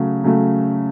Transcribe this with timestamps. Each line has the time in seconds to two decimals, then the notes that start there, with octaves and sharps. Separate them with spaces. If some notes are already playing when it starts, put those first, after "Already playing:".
Already playing: C#3 F#3 A3
0.24 C#3 F#3 A3